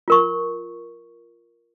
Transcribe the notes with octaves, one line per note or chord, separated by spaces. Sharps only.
F4 A#4 C#6